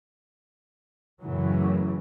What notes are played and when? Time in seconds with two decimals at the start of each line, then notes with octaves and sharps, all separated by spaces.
1.22 F#2 A2 C#3 E3 F#3